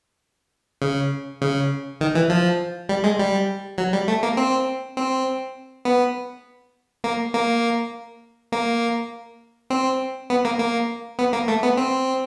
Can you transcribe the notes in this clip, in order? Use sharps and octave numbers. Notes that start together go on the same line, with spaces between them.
C#3
C#3
D#3
E3
F3
G3
G#3
G3
F#3
G3
A3
A#3
C4
C4
B3
A#3
A#3
A#3
C4
B3
A#3
A#3
B3
A#3
A3
B3
C4